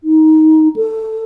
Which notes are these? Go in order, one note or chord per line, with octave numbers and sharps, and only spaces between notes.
D#4
A4